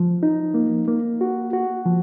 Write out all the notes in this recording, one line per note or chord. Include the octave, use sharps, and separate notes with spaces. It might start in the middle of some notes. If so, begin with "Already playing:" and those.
Already playing: F3
D#4
A#3
A#3
F#4
F#4
F3